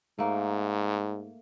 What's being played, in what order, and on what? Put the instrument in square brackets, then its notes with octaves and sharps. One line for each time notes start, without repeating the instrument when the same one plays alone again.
[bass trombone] G#2 [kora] A3 A#3